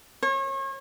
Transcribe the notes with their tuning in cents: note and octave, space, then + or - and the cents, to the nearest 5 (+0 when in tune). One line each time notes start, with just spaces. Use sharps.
C#5 -35